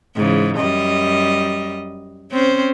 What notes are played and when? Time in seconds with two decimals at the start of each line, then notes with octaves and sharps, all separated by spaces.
0.16 G#2 C#3 E3
0.57 F#2 G3 D#5
2.31 C4 C#4 C5